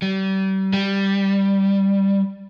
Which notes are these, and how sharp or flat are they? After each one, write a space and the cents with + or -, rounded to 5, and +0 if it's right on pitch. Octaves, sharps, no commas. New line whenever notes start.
G3 -35
G3 +0